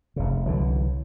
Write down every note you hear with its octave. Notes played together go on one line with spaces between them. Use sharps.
F1 C#3
C2 D3 E3 F#3